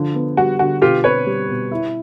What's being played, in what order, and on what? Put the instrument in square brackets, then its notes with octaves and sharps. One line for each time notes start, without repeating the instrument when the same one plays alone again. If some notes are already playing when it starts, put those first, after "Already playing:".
Already playing: [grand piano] D3 F3
B3
[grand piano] G3 [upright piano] F#4
[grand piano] D3 [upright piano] F#4
[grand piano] B2 [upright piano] F4 G4
[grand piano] C4 [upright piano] B4 C#5
[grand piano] G3
B2
E4